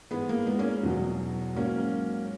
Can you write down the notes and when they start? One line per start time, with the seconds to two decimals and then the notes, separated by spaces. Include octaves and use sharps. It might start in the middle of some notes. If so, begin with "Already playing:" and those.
0.11 G#2 E3 G#3 B3
0.29 A#3
0.47 G#3 B3
0.59 A#3 C#4
0.83 E2 B2 F#3
1.56 G#2 F#3 A#3 C#4